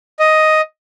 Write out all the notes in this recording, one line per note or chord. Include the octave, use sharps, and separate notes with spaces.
D#5